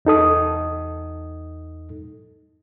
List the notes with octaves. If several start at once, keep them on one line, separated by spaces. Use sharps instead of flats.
E2 D#4 A4 D#6